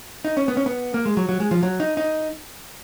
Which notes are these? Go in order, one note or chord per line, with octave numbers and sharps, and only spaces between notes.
D#4
C#4
B3
C#4
B3
A#3
G#3
F#3
F#3
G#3
F3
F#3
D#4
D#4